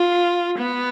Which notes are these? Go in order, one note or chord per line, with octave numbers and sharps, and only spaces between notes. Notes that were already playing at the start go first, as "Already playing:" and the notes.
Already playing: F4
B3